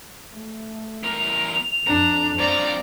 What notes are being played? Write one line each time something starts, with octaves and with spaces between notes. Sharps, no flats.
A3
E2 A#4 F7
F2 D4 A#5
G2 F3 C4 D5 A#5